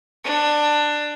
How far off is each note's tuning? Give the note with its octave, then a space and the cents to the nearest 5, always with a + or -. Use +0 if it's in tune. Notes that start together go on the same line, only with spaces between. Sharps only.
D4 +15